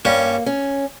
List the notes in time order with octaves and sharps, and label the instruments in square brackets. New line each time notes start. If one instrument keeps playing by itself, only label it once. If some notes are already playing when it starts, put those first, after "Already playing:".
[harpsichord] G2 G3 C#4 [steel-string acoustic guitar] A#3
[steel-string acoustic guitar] C#4